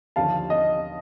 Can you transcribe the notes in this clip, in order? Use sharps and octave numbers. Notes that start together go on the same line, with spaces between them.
D#2 D3 F3 F5 A5
D#5